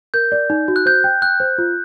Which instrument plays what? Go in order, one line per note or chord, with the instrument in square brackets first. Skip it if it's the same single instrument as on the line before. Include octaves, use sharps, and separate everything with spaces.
[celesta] A#4 [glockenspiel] G6
[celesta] D5
D#4
F#4
[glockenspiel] F#6
[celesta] C5 [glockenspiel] G6
[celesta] G5
[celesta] G5 [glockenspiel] F#6
[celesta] C5
F4